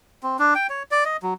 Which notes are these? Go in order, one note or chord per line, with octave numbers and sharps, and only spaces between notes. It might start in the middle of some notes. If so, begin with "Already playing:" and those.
C4
D4
G5
C#5
D5
D#5
F#3